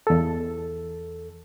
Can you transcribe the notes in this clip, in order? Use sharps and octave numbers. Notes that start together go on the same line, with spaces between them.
E2 A4